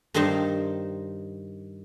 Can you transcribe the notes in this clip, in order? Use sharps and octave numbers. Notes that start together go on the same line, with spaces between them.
G2 D#3 D#4 A#4 C5 A5